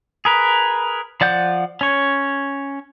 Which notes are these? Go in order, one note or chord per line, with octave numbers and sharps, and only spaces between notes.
G#4 A#4 B4
F3 D5 F#5 G6
C#4 C#5